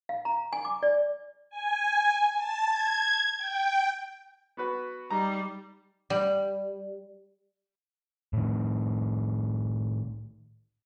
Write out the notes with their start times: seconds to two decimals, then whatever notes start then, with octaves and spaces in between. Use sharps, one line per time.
0.09 F5
0.25 A#5
0.53 G#5
0.65 D6
0.83 D5
1.50 G#5
2.36 A5
2.69 G#6
3.38 G5
4.57 B3 F#4 B4
5.10 G3 D#4 A#5
6.10 G3
8.33 A2 D#3